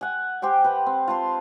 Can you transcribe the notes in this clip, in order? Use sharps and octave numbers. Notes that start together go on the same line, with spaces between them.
F#5 G#5
G4 C5 G5 G#5
B4 F#5 G5
C4
F4 A5 C6